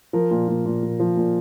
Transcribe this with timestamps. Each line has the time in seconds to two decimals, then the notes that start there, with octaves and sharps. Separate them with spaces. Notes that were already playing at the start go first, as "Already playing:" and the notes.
0.13 F3 A#4
0.31 A#2
0.48 A#2
0.65 A#2
0.83 A#2
1.00 F3
1.17 A#2